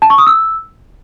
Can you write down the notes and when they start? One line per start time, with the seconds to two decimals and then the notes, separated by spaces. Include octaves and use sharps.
0.02 A5
0.10 C#6
0.18 D#6
0.27 E6